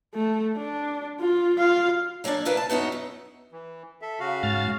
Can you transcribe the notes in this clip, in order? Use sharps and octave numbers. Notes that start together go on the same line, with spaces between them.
A3
D4
F4
F4 F5
F#3 A#3 C#4 D4 D5
D2 A#3 E4 A#4 B4 F5
A5
F#2 B3 D#4 F#4
F#2
E3
A4 E5
C#3 F#4 F5
G#2 F6 A6